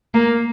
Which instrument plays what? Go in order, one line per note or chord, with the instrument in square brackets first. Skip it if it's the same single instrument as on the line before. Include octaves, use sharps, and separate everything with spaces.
[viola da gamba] A#3